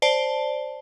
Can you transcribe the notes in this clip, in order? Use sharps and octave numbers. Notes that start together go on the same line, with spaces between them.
C5 D5 A5